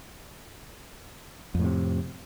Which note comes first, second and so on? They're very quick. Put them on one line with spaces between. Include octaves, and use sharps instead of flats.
F2 A2 C3